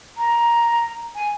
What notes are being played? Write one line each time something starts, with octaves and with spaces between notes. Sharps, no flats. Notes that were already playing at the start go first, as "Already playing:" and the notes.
A#5
G#5